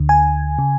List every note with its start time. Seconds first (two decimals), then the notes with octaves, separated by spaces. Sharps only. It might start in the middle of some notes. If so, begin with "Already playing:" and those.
Already playing: D2 D3
0.09 G#5
0.59 C#3